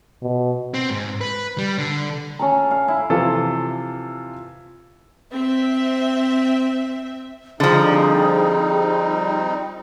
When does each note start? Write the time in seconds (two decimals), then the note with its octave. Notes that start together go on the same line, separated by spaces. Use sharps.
0.22 B2
0.74 C4
0.90 G#2
1.21 B4
1.58 G3
1.78 D3
2.39 C#4 A4 A#5
2.71 F5
2.88 E4
3.10 C3 E3 F3 F4 A4
5.33 C4 E5
7.60 D3 F3 G3 C4 D#4 G#4